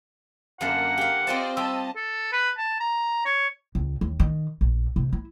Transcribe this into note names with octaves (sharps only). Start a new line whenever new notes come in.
F#2 D3 A#3 F5 F#5 A5
G4 F5
C4 F4 C5 D5 D#5 A5
G3 G4 D#5 A5 E6
A4
B4
A5
A#5
C#5
C#2
D#2
D#3
A#1
C3
E4